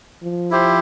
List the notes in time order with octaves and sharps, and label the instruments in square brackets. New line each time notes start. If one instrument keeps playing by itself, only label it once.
[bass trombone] F3
[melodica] E4 G4 C5